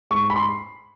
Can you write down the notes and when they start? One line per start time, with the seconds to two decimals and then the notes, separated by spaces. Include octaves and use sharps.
0.11 G#2 C#6
0.30 B5
0.36 C6